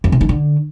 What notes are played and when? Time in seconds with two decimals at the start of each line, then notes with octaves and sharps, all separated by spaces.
0.04 F2
0.12 C3
0.21 D#3
0.29 D3